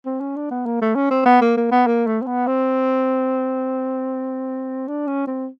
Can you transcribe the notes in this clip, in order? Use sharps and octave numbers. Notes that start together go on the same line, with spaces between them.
C4
C#4
D4
B3
A#3
A3
C#4
C4
B3
A#3
A#3
B3
A#3
A3
C4
B3
C4
D4
C#4
C4